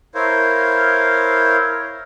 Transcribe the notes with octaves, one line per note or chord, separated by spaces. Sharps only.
E4 A#4 C5 C#5 F5